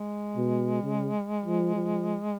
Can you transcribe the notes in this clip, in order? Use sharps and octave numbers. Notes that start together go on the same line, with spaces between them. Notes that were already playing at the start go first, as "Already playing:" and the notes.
Already playing: G#3
B2
C#3
F3
F3